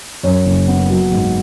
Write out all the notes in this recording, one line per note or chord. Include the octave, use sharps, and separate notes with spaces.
F#2 C#5
F#1
B3
F#3
G#2